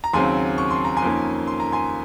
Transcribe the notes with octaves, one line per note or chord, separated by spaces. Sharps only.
A#5
D#2 C#3 F#3 C4 G#5 C6
C#6
C6
A#5
G#5 C6
F2 D#3 A#3 C#4
C6
A#5
G#5 C6